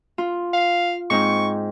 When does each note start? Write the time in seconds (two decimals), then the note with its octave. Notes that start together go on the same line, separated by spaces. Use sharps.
0.18 F4
0.53 F5
1.10 G#2 C4 D#4 C#6